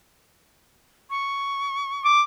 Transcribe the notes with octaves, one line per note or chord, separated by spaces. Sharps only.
C#6
D6